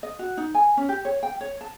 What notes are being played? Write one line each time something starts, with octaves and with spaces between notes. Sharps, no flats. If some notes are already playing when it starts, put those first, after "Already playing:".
D#5
F#4
D#4
G#5
C#4
G4
C#5
G5
C#5
A5